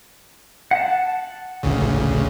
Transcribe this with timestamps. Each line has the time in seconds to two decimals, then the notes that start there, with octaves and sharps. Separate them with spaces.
0.71 F#5 A5
1.63 A1 D2 C#3